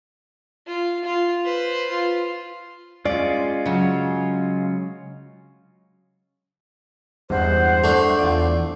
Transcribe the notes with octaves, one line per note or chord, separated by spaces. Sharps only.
F4
F4
B4 C5
F4
G#3 C#4 F4 D5
C#3 F#3
E2 G2 G#3 C5 F#5
A3 D4
E2 F4 D5